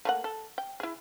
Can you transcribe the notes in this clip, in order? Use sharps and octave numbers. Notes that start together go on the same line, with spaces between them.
A3 A#3 F#5
A4
G5
E4 G#4